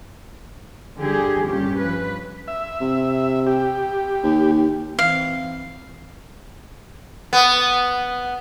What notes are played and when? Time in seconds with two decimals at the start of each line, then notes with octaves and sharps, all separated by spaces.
0.98 G2 D3 G4 G#4
1.46 G2 A#2 C#4 G4
1.79 F3 B4
2.48 E5
2.81 C3
3.47 G4
4.23 D#2
4.99 E3 C4 F5
7.33 B3